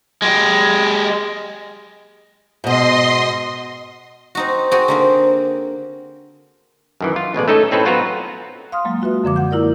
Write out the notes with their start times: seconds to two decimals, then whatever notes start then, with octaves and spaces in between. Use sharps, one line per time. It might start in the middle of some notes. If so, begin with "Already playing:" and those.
0.22 G#3 G4
2.64 G#2 B2 D#5 C6
4.35 C4 D#4 F#4
4.71 C4 F#4 G#4 G5
4.88 D3 A#3 C4
7.01 F#2 D#3 E3
7.16 F4
7.34 A1 B2 G#3 D5
7.48 A3 C#4 D#4 A4 C#5 D#5
7.71 A2 C4 C#4 A4 B4
7.85 F#3 B3 F4 F#4 B4 A#5
8.72 F5 C6 D#6 F6
8.85 F#3 G#3 A#3
9.02 F4 F#4 B4 E5
9.24 F#2 D3 F3 D6
9.36 F#5 G6
9.51 A#3 E4 F4 A#4 D5